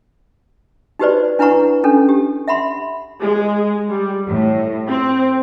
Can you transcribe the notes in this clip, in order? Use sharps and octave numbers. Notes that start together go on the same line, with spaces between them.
D#4 F#4 G4 B4 C5 D5
D4 E4 B4 F#5 A#5 C#6
C#4 D4 A4
G4
E5 F#5 B5 C6
G#3
G3
A2
C4